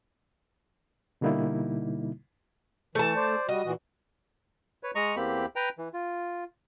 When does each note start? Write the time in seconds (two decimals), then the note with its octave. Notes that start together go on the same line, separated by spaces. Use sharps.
1.21 B2 D3 G3 A#3 D#4 E4
2.95 E3 A3 A5
3.16 C5 D5
3.49 G3 F#4 D#5
3.65 A#2 E3 F#4
4.83 B4 C#5
4.95 G#3 D#5 A#5 C#6
5.16 E2 A#3 C4 G4 B5
5.56 B4 G5 A#5
5.78 E3
5.94 F4